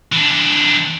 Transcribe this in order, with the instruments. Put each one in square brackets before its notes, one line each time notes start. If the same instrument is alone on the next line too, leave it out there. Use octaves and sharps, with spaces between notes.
[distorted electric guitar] E3 D4